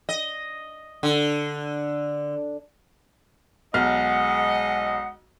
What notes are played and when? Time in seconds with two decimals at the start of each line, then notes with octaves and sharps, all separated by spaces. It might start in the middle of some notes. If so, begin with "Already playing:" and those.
0.09 D#5
1.03 D3
3.74 B1 G#3 D#5 F#5 F6